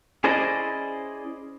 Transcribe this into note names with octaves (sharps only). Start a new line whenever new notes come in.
C#4 E4 G#4 C5 D5 D#5